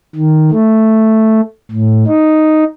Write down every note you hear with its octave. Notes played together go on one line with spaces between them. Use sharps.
D#3
A3
A2
D#4